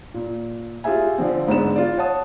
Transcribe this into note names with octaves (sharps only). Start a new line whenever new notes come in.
A#2
F4 G4 G#4 E5 G#5
D3 F3 C4
G#2 D3 G#3 B3 E7
F4 D5
C#5 F#5 A5 D#6